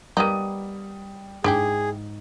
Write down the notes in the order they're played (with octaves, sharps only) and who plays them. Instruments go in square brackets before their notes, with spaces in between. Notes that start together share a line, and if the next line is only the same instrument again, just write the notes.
[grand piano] G3 D#6 D#7 [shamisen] A#3 B3 D#4
[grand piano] G#2 [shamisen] D4 E4 G4 [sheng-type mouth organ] G#4